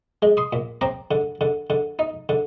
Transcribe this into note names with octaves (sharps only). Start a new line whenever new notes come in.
G#3
C6 D#6
A#2
C4 A#5 D6
D3
D3
D3
D#4
D3